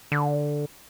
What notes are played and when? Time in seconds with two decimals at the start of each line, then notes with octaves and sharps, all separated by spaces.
0.12 D3